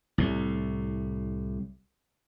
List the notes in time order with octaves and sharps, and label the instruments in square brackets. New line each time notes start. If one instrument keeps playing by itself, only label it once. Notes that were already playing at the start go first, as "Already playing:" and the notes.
[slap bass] C2 A2